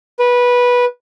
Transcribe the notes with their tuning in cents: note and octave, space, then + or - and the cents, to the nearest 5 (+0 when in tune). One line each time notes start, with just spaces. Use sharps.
B4 -15